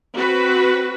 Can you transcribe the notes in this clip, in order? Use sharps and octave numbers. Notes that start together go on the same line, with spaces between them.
C4 F#4 B4